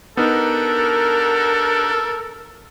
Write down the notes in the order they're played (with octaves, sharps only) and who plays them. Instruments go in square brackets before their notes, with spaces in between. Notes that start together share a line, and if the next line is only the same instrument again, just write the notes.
[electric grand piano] B3 D#4 [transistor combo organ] D4 G4 F#5 [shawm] A4 [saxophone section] A#4